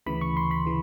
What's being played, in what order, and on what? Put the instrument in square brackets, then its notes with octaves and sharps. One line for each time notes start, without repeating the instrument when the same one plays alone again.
[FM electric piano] D2 C#3 E3 B5
C#6
C6
B5
C#3 E3